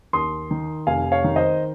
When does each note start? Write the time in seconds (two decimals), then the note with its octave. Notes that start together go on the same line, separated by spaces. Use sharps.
0.13 D#2 C6 D#6
0.51 D#3
0.87 F1 F5 G#5
1.12 C#5 F5
1.24 D#3
1.36 C5 D#5